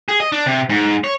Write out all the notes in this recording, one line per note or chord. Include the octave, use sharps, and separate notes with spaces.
G#4
D#5
D4
C3
G#2
C#5